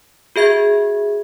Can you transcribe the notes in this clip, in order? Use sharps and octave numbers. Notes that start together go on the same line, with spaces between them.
F#4 G#4 E5 G#6